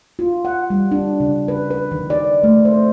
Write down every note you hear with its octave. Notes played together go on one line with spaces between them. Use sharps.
F4
F#5
G3
D4
C#3
B4
B4
D#3
D5
A3
C5